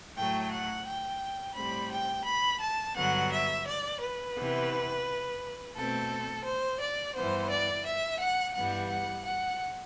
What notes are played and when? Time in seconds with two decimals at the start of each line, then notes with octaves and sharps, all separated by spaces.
0.15 A2 F#3 A3 G5
0.51 F#5
0.86 G5
1.55 A2 G3 C4 B5
1.91 G5
2.25 B5
2.60 A5
2.96 G2 D3 F#3 B3 F#5
3.31 E5
3.66 D5
4.01 B4
4.35 C3 E3 B3
5.75 B2 A3 C4 A4
6.46 C5
6.81 D5
7.15 G2 E3 B3 C5
7.51 D5
7.86 E5
8.21 F#5
8.55 G2 E3 G3 B3 F#5
8.90 F#5
9.26 F#5